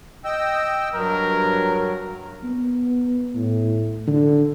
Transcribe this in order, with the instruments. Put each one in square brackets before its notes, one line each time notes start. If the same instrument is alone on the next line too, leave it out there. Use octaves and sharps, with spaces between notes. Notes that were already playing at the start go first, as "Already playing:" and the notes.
[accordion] D#5 G5 E6
[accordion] G2 F#3 [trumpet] A#4
[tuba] B3
A2
D3